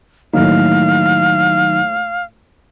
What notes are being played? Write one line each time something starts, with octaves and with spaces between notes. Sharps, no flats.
A2 D#3 F#3 A3 A#3 D#4 F5